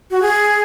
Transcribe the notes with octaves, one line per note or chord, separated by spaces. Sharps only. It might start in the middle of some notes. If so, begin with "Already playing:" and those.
F#4
G#4